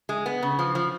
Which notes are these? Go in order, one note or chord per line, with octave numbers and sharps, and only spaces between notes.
G#3
B3
C#3
F3
F3